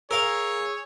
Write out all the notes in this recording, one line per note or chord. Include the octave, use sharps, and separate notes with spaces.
G#4 A#4 C#5 F5 E6